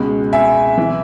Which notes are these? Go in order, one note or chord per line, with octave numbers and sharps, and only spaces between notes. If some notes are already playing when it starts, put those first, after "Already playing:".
Already playing: C#2 B2 G#3
E5 G#5
E3